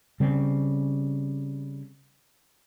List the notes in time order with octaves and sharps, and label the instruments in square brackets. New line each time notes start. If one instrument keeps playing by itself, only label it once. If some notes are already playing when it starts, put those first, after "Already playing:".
[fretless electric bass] C#3 G3 C4 C#4